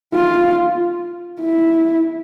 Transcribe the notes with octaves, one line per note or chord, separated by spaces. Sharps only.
F4
E4